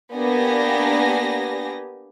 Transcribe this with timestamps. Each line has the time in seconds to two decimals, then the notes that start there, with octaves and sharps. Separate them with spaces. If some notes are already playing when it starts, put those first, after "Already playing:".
0.15 A#3 B3 D4 G4 G#5 A#6